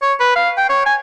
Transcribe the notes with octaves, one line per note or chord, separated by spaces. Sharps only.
C#5
B4
F5
G5
C#5
G#5